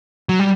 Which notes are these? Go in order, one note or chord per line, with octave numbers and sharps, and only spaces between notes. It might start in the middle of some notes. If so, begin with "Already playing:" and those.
F#3
G3